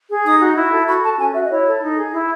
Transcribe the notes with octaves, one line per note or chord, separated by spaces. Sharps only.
G#4
D#4 D#6
F#4
E4
A4
F#4 B5
A4 A5
C#4 G#5
F#4 E5
D#5
E4 C#5
A4
D#4
G#4
E4